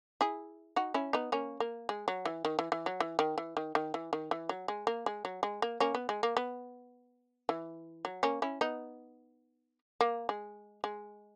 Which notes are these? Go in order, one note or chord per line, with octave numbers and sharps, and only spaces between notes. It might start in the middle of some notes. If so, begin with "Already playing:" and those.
E4 G#4
D#4 F#4
C#4 E4
B3 D#4
A#3 C#4
A#3
G#3
F#3
E3
D#3
E3
E3
F#3
E3
D#3
E3
D#3
D#3
E3
D#3
E3
F#3
G#3
A#3
G#3
F#3
G#3
A#3
A#3 C#4
B3
G#3
A#3
B3
E3
F#3
A#3 C#4
C#4 E4
B3 D#4
A#3
G#3
G#3